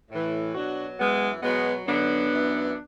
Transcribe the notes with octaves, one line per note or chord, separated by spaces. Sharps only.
A2 E3
B2 F#3 D4 F#4
F#2 E3 G#3 B3
B2 F#3 G#3 B3
F#2 D3 F#3 B3 D4
F#2 E3